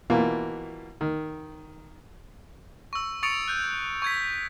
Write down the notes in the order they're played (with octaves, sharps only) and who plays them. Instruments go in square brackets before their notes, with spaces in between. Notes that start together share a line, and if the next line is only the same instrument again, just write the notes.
[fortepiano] B2 E3 A#3 F4
D#3
[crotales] C#6 E6
C#6 D#6 A6 C#7 D7 F7
F#6 G6
C#6 G#6 B6